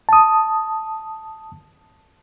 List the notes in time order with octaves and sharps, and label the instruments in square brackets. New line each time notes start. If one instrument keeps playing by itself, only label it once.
[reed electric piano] A5 D#6